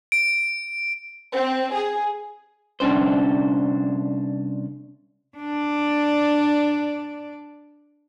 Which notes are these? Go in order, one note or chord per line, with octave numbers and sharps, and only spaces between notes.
D7
C4
G#4
C2 C#4 D4 C5
D4 D5